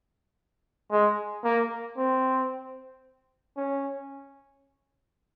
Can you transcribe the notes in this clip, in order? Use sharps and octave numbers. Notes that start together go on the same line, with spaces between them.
G#3
A#3
C4
C#4